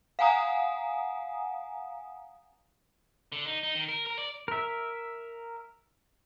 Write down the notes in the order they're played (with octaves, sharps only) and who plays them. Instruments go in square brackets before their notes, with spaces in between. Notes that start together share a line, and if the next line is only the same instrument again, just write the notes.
[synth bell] F5 F#5 G#5 A#5 D#6
[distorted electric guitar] D3
D#4
D#4
D#3
A#4
A#4
D5
[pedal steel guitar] A#4 E5